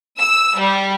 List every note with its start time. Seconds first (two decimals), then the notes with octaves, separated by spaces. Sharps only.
0.19 E6
0.57 G3